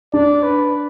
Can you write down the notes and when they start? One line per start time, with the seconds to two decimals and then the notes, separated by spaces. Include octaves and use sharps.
0.13 D4 D5
0.43 B4